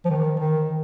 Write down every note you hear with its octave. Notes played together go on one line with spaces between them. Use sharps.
F3
D#3
D#3